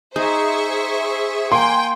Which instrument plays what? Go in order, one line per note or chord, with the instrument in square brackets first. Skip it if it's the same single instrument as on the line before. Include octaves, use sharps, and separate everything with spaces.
[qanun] D#4 [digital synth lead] G#4 [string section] C5 E5 C#6
[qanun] A#3 [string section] G5 [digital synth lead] G#5 [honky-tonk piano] C6